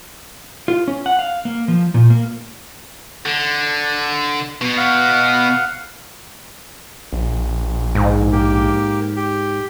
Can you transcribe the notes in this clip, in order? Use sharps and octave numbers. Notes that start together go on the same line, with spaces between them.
F4
C#4
F#5
F5
A#3
F3
A#2
A#3
D3
B2
F5 F#5
A#1
G#2
A#3 G4
G4